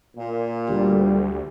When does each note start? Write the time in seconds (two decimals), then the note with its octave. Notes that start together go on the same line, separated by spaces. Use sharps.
0.16 A#2
0.69 D2 G3